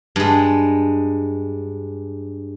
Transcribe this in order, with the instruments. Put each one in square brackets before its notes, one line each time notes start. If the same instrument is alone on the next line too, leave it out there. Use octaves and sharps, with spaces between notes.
[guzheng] G2 G#3